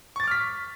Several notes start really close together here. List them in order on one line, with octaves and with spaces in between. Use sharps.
C#6 A6 D6 F6 B6